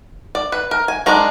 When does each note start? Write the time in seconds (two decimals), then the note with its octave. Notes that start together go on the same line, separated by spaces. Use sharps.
0.35 D5
0.52 B4
0.71 A#4
0.88 G#5
1.06 D#3 G#3 D4 A#5